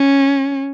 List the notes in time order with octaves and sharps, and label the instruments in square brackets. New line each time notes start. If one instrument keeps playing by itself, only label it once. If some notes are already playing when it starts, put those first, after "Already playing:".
Already playing: [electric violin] C#4